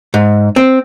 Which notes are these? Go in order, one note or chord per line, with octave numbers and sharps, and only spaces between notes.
G#2
C4